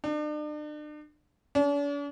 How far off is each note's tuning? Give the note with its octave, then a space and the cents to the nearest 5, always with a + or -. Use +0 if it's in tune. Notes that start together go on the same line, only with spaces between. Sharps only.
D4 +40
D4 -45